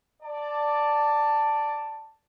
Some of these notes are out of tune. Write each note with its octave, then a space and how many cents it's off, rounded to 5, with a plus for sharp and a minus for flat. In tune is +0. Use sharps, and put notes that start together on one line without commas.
D5 +0 A5 +10